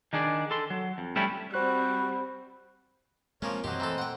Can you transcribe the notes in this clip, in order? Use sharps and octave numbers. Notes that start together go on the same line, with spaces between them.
D#3 D4 G#4 D5
A4 C6
F#3
F2
G3 A3 C#4 D4 E4 G4
G3 C4 F#4 C5 B5 F#6
F3 G#3 A#3 C4 C#4 A#4 C#5
F#2 B2 E3 F#3 C4 G4 C5 D#5
A#2 E3 A3 A4 A#5 C6 E6
F#5 G5